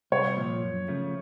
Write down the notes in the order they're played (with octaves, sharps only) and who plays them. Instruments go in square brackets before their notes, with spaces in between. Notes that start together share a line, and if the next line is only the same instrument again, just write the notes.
[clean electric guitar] C2 [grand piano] C#5
[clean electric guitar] A#2 F3
F#2
C#3 F3 A3